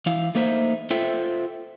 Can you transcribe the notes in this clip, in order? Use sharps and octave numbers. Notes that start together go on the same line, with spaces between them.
E3 E4 F5
A3 A#3 D#4 C5 E5
F4 A4 C5 E5 G5